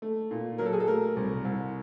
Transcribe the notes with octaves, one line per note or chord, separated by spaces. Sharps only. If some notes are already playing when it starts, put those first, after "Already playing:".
A3
A#2
F#3 A#4
A4
G#4
A4
A3 A#4
C2
C2